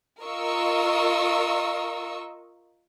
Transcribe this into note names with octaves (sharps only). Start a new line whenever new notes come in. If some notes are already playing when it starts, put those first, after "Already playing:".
F4 A#4 D#5 C#6 E6